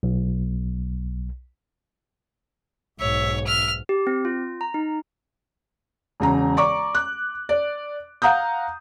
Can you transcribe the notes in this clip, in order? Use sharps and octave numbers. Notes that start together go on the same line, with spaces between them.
B1
B1 G#2 C#5 E5
E5 F6
G4
C4
F4
A#5
D#4
E1 C#3 A#5
D5 A#5 C#6 D6
F#6
D5
F5 F#5 A#5 D#6 G6